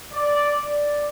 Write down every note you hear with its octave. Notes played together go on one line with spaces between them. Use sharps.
D5
D5